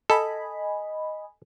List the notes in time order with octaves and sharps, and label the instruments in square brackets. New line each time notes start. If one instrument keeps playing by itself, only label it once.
[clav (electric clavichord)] A4 [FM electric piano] D#5 G#5 B5